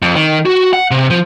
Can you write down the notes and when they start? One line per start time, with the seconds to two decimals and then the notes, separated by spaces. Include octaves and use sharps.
0.02 F2
0.16 D#3
0.46 F#4
0.73 F#5
0.91 C3
1.10 F3